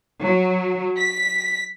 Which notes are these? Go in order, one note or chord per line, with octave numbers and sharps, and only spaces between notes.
F#3
B6